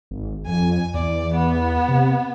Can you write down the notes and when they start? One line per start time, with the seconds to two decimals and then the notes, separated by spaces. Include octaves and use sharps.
0.11 G#1
0.47 F2 G#5
0.94 E2 D5
1.35 B3
1.88 C3